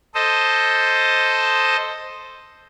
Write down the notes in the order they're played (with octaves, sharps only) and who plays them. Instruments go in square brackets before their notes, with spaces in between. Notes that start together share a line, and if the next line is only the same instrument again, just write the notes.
[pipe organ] A4 C5 D#5